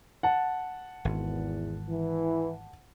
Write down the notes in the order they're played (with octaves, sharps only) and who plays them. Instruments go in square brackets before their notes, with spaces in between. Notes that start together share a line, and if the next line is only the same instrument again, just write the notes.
[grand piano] F#5 A5
[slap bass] G#1 [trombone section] E2
[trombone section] E3